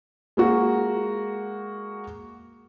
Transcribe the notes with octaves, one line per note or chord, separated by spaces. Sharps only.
G#3 A#3 F#4